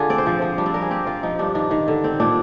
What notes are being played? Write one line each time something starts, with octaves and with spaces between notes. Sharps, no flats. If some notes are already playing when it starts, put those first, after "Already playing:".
Already playing: D3 D4 F4 G#4
C4 D5
C5
F3
F3
G3 D4
C4
G3 A#4
G#4
C4 G4
C4 F4
F3 D#4
G2 D4
D#3 D4
D#3
D3
C4
A#2 D4